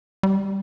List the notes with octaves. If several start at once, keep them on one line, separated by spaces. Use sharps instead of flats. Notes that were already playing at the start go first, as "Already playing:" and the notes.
G3